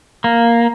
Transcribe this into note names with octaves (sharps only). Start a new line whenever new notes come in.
A#3